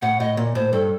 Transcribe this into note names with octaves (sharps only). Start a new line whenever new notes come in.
A2 F#5
A2 D#5
A#2
A2 C5
G2 A4